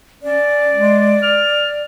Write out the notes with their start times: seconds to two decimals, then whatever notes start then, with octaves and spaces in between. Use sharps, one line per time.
0.23 C#4 D5
0.72 G#3
1.23 F6